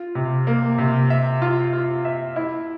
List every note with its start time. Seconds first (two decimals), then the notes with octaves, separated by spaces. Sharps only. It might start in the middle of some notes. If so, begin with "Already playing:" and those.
Already playing: F4
0.15 C3
0.47 A#3
0.78 C3
1.10 E5
1.42 F4
1.73 F4
2.05 E5
2.36 E4